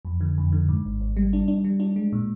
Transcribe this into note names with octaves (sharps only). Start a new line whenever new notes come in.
F2
D3
F2
D3
G#2
G#1
G#1
G3
D4
D4
G3
D4
G#3
A#2